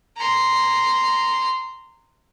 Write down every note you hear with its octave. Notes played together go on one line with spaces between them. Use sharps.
A#5 C6